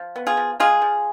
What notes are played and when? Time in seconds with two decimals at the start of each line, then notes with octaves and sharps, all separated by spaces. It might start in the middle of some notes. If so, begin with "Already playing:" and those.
Already playing: F3
0.16 B3
0.27 F4 G#4
0.37 F3
0.60 G#3 F4 G#4
0.82 F3